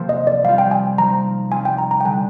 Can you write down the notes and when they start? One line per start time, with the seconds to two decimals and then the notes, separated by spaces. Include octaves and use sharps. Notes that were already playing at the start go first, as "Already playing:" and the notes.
Already playing: C3 F3 A#3 C4
0.09 D#5
0.27 D5
0.44 G3 C4 F4 F5
0.58 G5
0.71 G#5
0.98 F3 C4 D#4 A#5
1.51 G3 C4 F4 G#5
1.65 G5
1.78 A#5
1.91 A#5
2.01 G5
2.04 D3 G3 D4 G#5